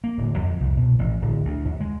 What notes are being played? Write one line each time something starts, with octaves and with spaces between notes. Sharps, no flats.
A#3
D1
F2
C2
B2
A1
D1
D2
D#2
G#3